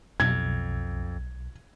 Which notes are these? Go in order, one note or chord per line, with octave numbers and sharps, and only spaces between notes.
B1 F2 G#6